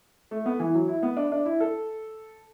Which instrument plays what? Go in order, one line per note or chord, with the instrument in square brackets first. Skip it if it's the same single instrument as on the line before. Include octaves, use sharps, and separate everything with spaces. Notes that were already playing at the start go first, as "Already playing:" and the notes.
[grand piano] A3
B3
E3
F#3
E4
B3
D4
D4
E4
A4